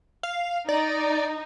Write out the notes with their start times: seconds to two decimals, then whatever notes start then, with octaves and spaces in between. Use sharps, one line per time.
0.23 F5
0.69 D#4 D5